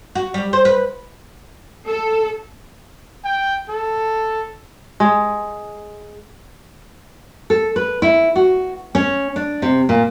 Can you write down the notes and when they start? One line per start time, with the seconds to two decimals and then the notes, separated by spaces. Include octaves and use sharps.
0.15 F#4
0.34 G3
0.53 C5
0.65 B4
1.85 A4
3.24 G5
3.69 A4
5.00 G#3
7.50 A4
7.76 B4
8.02 E4
8.36 F#4
8.95 C#4
9.36 D4
9.62 C3
9.89 A#2